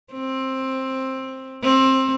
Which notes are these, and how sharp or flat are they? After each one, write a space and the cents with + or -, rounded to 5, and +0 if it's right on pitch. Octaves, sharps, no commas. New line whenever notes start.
C4 +15
C4 +20